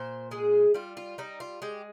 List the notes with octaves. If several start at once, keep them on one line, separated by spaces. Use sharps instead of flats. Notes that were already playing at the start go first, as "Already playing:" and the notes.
Already playing: A#2 C5
G#3 G#4
G3 F4
F4
G3 D#4
F4
G#3 G4